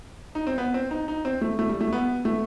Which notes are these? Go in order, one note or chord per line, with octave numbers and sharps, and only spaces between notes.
D#4
C4
B3
C4
D#4
D#4
C4
A3
A3
G3
A3
B3
A3